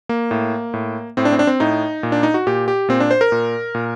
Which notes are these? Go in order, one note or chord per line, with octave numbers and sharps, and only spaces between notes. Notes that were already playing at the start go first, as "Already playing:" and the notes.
A#3
A2
A2
A2 C4
D4
C4
D4
C4
A2 D#4
A#2
D4
D#4
F#4
A#2 G4
G4
A#2 C4
D4
C5
A#4
A#2
A#2